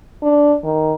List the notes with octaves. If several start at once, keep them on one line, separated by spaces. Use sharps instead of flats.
D4
D#3